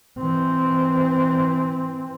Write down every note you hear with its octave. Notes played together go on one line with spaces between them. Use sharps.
E3 C4